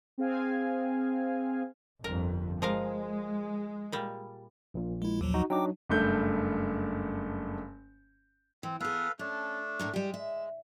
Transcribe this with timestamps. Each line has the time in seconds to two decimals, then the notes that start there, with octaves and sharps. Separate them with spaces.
0.18 C4 G#4 F5 G#5
2.04 G1 F2 A#4
2.62 F3 G#3 A#4 F5
3.92 A#2 G3
4.74 A#1 A#2
5.02 G#3 E4
5.21 D#2 F3 F#3
5.34 D#4 F#4
5.50 F#3 D4 D#4 G5 D6
5.89 F#1 G2 A3 G6
8.63 E3 C4
8.80 B3 G#4 A4 B4 F5
9.19 A3 C#4 D4
9.79 A2 D3 A#4
9.93 G3 G#3 G4
10.14 E5